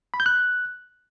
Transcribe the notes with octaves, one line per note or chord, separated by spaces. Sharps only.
B5
G6
F#6